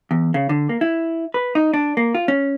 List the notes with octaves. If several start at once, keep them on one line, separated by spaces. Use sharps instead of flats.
E2
C#3
D3
A#3
E4
B4
D#4
D4
A#3
F4
C#4